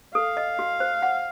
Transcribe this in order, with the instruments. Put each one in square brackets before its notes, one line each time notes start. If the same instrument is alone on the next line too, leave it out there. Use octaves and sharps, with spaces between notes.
[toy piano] A4 [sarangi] F5
[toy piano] D#5
F#4
C5
F#5